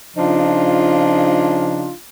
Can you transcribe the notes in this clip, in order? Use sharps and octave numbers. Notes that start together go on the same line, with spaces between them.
C#3 F3 D4 D#4 F4